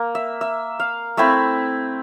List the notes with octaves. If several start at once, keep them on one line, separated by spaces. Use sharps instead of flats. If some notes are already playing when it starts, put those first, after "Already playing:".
Already playing: A#3
E5
E5
F5
A3 C4 E4 E5